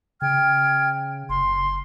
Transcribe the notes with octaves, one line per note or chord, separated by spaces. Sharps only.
C#3 G5 F6 G#6
F#1 C6